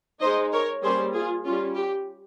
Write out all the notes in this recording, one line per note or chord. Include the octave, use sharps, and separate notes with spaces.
G#3 D#4 C5 D#5
A#4 C#5
G3 A#3 C#4 G#4 C5
F4 G#4
G3 C#4 F4
G4